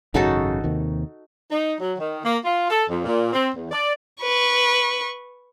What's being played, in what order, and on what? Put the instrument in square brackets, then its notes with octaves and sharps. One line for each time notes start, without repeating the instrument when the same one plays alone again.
[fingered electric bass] G#1 F#2 C#3 [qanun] D#4 F#4 A4
[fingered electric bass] D#2 C3 D#3
[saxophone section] D#4
F#3
D#3
A#3
F4
A4
F2
A#2
C4
E2
D5
[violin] B4 C#6